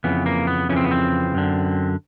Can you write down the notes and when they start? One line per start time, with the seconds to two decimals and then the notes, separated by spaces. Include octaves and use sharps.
0.04 F2 C#3 E3 B3
0.26 A#3
0.47 B3
0.69 F2 C#3 E3 C#4
0.76 C4
0.84 B3
0.91 C4
1.34 F#2 D3